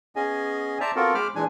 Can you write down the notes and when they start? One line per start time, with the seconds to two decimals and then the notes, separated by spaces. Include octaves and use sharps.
0.16 B3 C#4 G#4 D#5 G#5
0.80 C5 D5 E5 A5 A#5
0.96 B3 C4 F4 F#4 A4 A#4
1.15 G#3 C5 B5 D6 F6
1.35 A#2 E3 G#3 D4 G#5